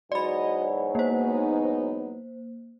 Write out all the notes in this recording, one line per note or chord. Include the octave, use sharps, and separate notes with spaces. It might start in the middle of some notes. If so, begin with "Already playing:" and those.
E2 G#2 F#3 F#4 D5 D#5 B5
A#3 B3 D#4 C5